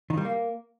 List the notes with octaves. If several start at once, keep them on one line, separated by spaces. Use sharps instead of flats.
D#3
G3
A#3